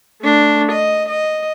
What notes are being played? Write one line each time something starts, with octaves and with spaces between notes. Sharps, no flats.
A3 D4
D#5
D#5